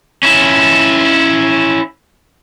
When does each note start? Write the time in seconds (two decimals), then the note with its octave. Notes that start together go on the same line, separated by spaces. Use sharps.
0.23 C#4 E4